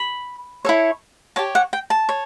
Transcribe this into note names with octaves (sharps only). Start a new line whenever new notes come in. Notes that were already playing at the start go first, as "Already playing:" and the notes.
Already playing: B5
E4 A4 C#5
G4 C#5 A5
F#5
G5
A5
C#5